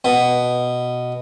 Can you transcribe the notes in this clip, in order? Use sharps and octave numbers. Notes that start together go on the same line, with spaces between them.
B2